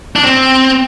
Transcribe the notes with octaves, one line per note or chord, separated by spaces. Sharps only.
D4
C4